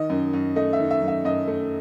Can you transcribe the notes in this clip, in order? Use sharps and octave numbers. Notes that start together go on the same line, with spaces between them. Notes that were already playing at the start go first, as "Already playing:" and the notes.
Already playing: D#3 D#5
F#2
F#2
A3 D#5
E5
D#3
E5
F#2
E5
F#2 D#5
A3